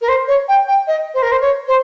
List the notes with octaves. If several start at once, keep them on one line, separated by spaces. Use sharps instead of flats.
A#4
C5
C#5
G5
G5
D#5
C5
A#4
C5
C#5
C5